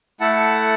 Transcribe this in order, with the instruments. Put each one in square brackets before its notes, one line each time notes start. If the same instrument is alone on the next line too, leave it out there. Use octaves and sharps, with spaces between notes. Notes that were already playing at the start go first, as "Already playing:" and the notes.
[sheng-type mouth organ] A3 E4 A4 F#5 A5